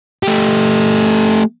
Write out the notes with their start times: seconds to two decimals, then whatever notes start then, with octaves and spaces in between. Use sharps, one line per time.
0.23 A3 G4